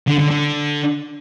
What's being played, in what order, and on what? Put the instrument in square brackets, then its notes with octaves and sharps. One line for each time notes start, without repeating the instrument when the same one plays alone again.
[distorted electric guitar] D3
D3
D3